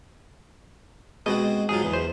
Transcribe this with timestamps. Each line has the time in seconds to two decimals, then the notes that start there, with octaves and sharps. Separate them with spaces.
1.26 B2 G#3 C4 F#4 D#5
1.69 G#2 F#3 F4 G#4
1.82 E2 E3
1.93 C5